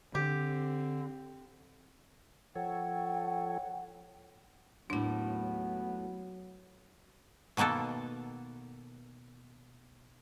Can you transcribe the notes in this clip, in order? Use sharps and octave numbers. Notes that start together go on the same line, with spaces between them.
D3 C4 G4
F3 A4 C#5 F#5 G5
D#2 A2 F#3 B3 D4 E4
B2 D#3 A#3 B3 A4